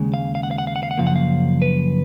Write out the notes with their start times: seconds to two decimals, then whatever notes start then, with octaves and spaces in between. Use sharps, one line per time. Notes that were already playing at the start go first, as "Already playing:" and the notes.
Already playing: D#2 C#3 G#3
0.14 F5
0.35 F5
0.43 F#5
0.51 F5
0.58 F#5
0.67 F5
0.76 F#5
0.83 F5
0.91 F#5
0.97 F#2 C#3 F3 A#3 F5
1.07 F#5
1.16 F5
1.62 B4